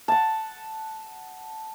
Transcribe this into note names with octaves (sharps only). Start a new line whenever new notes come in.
F#5 A5